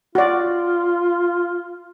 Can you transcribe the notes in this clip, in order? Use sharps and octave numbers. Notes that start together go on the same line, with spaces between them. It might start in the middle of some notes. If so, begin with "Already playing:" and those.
F4 F#4 D5